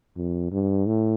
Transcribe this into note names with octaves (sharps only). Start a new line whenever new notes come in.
F2
G2
A2